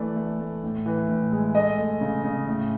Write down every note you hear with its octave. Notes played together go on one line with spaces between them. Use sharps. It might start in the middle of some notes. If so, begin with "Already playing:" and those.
Already playing: E3 A3 D5
A3
A3
A2
E3
A2
G#3
A3 D#5
A3
C#3
C#3
A2